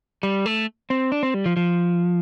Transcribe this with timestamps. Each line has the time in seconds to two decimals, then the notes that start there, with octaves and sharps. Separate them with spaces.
0.23 G3
0.46 A3
0.90 C4
1.12 D4
1.23 C4
1.34 G3
1.46 F3
1.57 F3